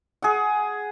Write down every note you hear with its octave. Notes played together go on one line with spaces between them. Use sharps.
G#4 F#5